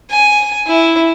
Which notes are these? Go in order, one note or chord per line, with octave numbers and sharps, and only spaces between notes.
G#5
E4